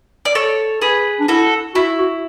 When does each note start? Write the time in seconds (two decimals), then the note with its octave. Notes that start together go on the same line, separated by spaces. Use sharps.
0.25 D5
0.35 A4 C#5
0.82 G#4 B4
1.20 D4
1.28 E4 F#4 A4
1.75 E4 F#4
1.99 F#4